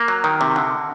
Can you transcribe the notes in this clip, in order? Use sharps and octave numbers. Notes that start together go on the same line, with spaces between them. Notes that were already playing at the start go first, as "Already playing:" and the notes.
Already playing: A#3
F#3
D#3
C3
D3